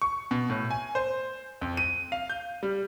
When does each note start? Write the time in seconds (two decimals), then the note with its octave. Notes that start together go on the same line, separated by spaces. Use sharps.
0.02 C#6
0.31 B2
0.50 A2
0.70 G#5
0.95 C5
1.61 F2
1.77 D#7
2.12 F5
2.29 G6
2.63 G3